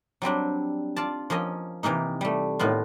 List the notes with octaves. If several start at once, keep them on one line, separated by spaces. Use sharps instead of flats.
F#3 G3 C4 D4
F4 D5 A5
F3 A#3 C#4 D#5
C3 E3 A#3 D#4
G3 A3
A2 D#3 B3 F4